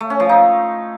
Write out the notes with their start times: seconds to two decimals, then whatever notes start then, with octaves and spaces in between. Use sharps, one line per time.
0.01 A3
0.10 C#4
0.20 F3
0.29 D#4